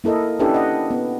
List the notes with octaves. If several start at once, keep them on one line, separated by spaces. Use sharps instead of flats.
A#3 E4 A4 A#4 D#5
C#4 D4 E4 G4 A4 B4
D#5 F#5
B3